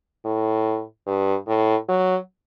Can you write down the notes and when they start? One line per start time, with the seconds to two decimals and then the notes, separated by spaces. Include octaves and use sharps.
0.25 A2
1.07 G2
1.47 A2
1.88 F#3